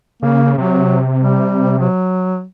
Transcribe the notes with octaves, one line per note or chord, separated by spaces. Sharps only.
C#3 A#3
C3 F#3
G3
F#3